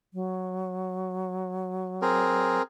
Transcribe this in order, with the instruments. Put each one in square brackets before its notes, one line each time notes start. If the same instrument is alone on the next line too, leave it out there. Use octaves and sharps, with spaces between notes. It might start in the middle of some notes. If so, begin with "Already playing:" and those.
[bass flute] F#3
[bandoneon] C4 G#4 A#4